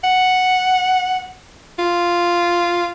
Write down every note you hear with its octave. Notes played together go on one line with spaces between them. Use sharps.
F#5
F4